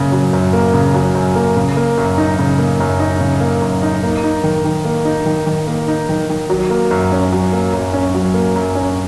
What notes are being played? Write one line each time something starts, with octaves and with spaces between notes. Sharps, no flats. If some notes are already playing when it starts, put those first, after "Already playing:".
Already playing: F#2 C#3 A#3
F#3
F#2
A#3
C#3
F#3
F#2
A#3
C#3
A#3
F#2
D#4
C#3
A#3
F#2
D#4
C#3
A#3
F#2
D#4
A#3
D#4
D#3
D#3
A#3
D#4
D#3
D#3
A#3
D#4
D#3
D#3
F#3
A#3
F#2
C#4
F#3
A#3
F#2
C#4
F#3
A#3
F#2
C#4